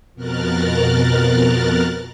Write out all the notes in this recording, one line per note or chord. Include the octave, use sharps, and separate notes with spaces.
F2 B2 A#4 F6 F#6 A6